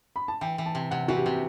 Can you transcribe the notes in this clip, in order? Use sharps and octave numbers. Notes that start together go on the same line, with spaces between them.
B5
A5
E3 G5
E3
A5
C3
C3 F#5
E3 F#4
G4
C3